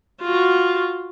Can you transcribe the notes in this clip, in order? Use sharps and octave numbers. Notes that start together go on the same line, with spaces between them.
F4 F#4